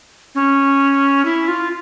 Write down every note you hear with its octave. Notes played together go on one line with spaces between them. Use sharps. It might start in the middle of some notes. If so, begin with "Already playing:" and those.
C#4
E4
F4